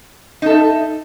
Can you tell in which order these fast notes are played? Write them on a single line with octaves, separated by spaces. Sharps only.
D#4 A4 E5